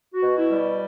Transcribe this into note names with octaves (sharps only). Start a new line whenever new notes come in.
F#4
B2
E4
G3